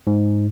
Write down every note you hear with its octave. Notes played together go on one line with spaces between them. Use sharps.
G#2